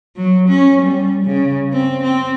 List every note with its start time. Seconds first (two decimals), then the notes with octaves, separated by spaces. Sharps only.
0.17 F#3
0.49 C#4
0.82 G3
1.25 C#3
1.73 C4
2.03 C4